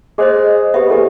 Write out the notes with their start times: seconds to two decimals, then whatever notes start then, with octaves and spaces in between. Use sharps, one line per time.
0.18 G#3 G#4 C5 D#5
0.74 B3 G4 E5
0.90 E2 G4 A4